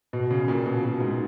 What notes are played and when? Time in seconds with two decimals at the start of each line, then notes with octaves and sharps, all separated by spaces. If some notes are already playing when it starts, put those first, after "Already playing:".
0.13 B2
0.31 C#3
0.48 A#2
0.66 B2
0.83 B2
1.00 G#2